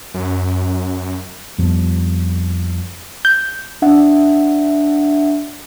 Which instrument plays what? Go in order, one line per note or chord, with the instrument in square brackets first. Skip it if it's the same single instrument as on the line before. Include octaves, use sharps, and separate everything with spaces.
[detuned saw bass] F#2
[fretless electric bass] F2 F3 G3 B3
[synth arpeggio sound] G6
[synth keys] D4 E5 F#5